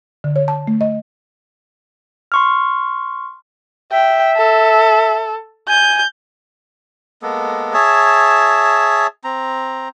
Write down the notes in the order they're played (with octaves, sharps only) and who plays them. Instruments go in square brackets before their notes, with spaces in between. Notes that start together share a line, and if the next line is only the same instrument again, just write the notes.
[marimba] D3
C#5
A5
A3
D#5
[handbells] C6 C#6 F6
[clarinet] E5 [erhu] G5
[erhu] A4
[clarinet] G#5 [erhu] G6
[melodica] G#3 A#3 B3 A4
G#4 C#5 E5 A5
C4 A#5